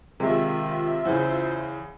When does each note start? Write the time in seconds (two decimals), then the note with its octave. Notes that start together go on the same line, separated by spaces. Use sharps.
0.20 C3 D#3 G#3 F4 E5
1.05 E2 C#3 C5